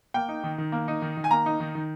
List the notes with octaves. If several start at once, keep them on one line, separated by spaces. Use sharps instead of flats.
A#3 G5
D#4
D#3
D#3
A#3
D#4
D#3
D#3
G#5
A#3 A#5
D#4
D#3
D#3